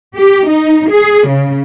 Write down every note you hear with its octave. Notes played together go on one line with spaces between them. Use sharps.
G4
D#4
G#4
C#3